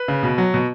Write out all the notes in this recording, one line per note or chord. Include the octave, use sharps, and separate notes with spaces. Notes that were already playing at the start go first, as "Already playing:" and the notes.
Already playing: B4
C#3
B2
F#3
B2